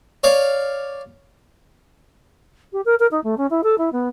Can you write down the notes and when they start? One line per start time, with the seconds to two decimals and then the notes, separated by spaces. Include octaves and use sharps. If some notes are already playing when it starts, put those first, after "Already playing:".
0.23 C#5 D5 F5
2.72 G4
2.85 A#4
2.99 A#4
3.11 D#4
3.24 A3
3.37 C#4
3.50 E4
3.63 A4
3.78 E4
3.92 B3